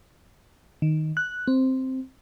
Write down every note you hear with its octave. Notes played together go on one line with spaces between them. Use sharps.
D#3
F#6
C4